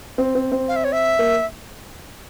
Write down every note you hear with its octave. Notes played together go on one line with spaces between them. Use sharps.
C4
C4
C4
F5
E5
C#5
E5
A#3